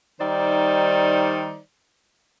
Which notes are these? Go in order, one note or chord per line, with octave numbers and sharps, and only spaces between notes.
D#3 G3 D#4 C5 D5